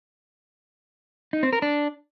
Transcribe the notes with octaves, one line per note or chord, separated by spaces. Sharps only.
D#4
C4
A#4
D4